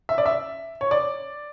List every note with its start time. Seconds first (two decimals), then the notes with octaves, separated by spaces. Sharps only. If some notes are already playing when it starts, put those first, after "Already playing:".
0.09 E5
0.18 D5
0.26 E5
0.81 C#5
0.91 D5